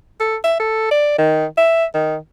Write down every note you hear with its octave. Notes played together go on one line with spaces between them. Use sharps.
A4
E5
A4
D5
D#3
E5
D#3